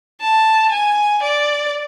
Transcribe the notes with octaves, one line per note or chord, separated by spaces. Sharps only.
A5
G#5
D5